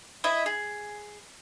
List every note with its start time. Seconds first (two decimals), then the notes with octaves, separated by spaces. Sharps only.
0.24 E4 D#5 E5
0.46 G#4